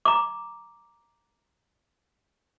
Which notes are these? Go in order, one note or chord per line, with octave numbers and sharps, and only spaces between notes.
A#5 D6